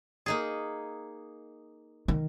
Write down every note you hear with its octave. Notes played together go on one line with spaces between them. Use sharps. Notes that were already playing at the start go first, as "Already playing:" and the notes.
A#3 D#4 G#4
D#3